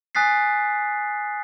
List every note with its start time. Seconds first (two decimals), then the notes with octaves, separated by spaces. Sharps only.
0.15 G#5 D#6 F#6 A6 B6 C7